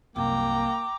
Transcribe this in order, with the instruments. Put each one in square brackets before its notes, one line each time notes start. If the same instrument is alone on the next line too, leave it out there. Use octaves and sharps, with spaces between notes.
[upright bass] C2 F#2 [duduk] A#3 [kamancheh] G5 A#5 [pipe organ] D6